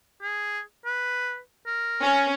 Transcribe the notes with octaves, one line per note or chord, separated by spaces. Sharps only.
G#4
B4
A#4
C#4